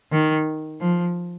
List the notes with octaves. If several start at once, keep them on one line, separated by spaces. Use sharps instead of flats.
D#3
F3